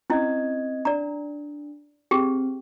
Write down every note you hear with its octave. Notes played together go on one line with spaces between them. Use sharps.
C4 C#4 E4 D#5 G#6
D4 D5 A#5
C4 G4 G#4 G5